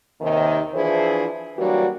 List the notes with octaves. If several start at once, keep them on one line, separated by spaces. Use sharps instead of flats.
D#2 C3 D#3
E3 F3 D4 E4 G#4 C5
E3 F#3 G3 A#3 D4 F#4